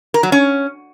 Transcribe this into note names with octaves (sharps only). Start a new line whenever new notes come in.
A#4
F#3
C#4